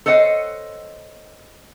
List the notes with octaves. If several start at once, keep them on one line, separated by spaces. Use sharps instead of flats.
A4 C5 C#5 D#5 F#5